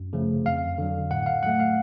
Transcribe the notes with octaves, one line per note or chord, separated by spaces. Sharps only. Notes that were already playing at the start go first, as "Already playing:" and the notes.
Already playing: F#2
C#3 F3 A3
F2 F5
D3 F#3
A2 F#5
F5
F#3 A3 F#5
F5